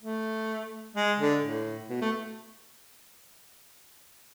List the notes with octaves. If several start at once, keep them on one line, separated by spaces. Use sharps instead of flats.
A3
G#3
D3
A2
B2
A3